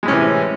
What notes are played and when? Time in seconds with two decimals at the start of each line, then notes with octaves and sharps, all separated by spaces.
0.03 G#3
0.05 A2
0.08 C#4
0.11 C3
0.13 E3